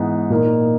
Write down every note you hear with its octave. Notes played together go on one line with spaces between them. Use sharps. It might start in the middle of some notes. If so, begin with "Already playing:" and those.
Already playing: G#2 E3 B3 D#4
A#2 A#3 D#4